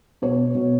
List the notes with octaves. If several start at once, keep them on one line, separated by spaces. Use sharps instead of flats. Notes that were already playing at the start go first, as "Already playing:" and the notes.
B2 C#5
B2